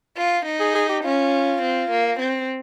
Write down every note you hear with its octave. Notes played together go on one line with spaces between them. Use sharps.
F4
D#4
G#4
G#4
G4
C#4 F4
C4
A#3
C4